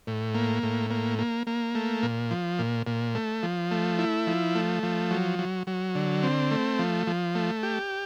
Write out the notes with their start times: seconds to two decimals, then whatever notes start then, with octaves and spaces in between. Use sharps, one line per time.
0.07 A2
0.35 A#3
0.63 A2
0.90 A#3
1.19 A#3
1.47 A#3
1.75 A3
2.03 A#2
2.31 F3
2.59 A#2
2.87 A#2
3.15 A3
3.43 F3
3.71 A3
3.99 E4
4.27 F3
4.55 A3
4.83 F3
5.11 F#3
5.39 F#3
5.67 F#3
5.95 D3
6.23 C4
6.51 A3
6.79 F3
7.07 F3
7.35 A3
7.63 G4